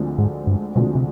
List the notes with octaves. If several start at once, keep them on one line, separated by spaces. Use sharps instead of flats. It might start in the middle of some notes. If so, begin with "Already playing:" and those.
Already playing: D2 D3 F3 G#3 C4
G#2
G2
D2 B2 D3 F3 G#3 C4
C3